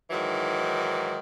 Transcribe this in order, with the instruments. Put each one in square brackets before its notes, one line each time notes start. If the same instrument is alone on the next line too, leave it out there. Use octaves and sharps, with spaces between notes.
[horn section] G#2 D#3 E3 F#3